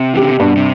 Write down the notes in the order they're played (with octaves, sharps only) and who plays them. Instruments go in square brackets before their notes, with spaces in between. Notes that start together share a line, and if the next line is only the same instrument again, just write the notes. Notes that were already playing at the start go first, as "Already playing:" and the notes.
Already playing: [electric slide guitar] C3
E3
[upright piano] G4
[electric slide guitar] D3
C3
[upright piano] G2 [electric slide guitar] B2
[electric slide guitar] C3